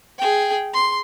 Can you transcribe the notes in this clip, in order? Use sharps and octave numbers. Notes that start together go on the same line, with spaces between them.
G#4 G5
C6